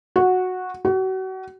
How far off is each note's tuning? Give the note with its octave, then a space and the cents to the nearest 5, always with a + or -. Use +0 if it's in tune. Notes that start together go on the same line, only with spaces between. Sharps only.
F#4 -10
F#4 +35